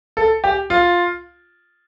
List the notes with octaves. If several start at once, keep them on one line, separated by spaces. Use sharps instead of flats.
A4
G4
F4